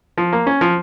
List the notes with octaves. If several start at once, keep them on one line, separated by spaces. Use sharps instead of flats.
F3
A#3
C#4
F3